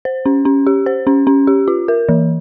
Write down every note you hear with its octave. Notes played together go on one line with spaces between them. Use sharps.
C5
C#4
C#4
G4
C5
C#4
C#4
G4
F4
A#4
E3